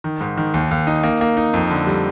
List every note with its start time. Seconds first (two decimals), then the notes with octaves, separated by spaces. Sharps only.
0.04 D#3
0.21 G#2
0.37 D#3
0.54 D#2
0.71 D#2
0.87 D#4
1.03 A#3
1.21 A#3
1.37 D#4
1.54 F2
1.70 D3
1.87 G3